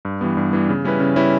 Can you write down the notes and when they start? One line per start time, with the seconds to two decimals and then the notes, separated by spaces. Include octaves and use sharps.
0.05 G2
0.21 E3 G3 B3
0.37 G2
0.53 E3 G3 B3
0.69 C#3
0.85 G3 C#4 E4 B4
1.00 C#3
1.16 G3 C#4 E4 B4